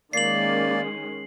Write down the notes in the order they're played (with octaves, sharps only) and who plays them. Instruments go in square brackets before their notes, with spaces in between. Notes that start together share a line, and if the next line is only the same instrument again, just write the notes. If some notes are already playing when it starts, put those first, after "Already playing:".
[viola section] D#3 G#3 C#4 [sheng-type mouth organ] A#3 D5 [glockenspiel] C7 F#7